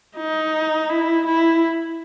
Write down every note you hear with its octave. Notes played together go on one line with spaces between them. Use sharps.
D#4
E4
E4